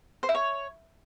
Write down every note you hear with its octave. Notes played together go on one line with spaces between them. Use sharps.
C5
E4
C#5